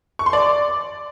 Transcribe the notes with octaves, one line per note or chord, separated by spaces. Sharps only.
C#6
C6
D5